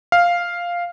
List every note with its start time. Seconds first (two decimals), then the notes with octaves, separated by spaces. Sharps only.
0.12 F5